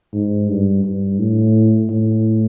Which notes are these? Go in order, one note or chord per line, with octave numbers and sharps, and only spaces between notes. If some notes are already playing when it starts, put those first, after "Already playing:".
G#2
G2
G2
A2
A2